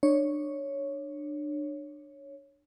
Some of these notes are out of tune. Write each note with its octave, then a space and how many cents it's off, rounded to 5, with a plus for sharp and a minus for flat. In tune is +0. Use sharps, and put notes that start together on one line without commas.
D4 +25 C#5 +0